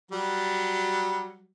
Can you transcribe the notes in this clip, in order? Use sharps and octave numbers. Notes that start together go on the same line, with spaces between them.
F#3 G3